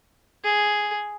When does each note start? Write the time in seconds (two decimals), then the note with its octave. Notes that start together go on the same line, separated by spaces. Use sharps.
0.44 G#4